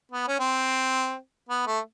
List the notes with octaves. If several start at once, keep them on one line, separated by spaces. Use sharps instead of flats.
B3
C#4
C4
B3
A3